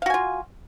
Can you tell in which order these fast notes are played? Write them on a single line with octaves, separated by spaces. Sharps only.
F5 F#4 G#5 F4